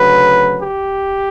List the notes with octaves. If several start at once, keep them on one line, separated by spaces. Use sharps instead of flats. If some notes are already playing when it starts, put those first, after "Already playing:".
Already playing: D2 C#3 F#3 B4
G4